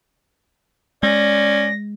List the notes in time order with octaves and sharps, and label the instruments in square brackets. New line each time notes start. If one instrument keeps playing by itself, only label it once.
[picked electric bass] G#3 [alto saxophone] C#4 [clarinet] D5 [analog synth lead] A#6